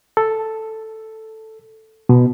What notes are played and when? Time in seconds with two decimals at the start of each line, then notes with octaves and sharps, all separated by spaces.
0.17 A4
2.09 B2